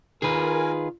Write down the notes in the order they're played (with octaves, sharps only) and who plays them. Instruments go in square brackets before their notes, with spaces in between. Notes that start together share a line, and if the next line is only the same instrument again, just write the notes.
[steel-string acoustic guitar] D#3 F4 [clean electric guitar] G#4 B4 [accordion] A#4 G#5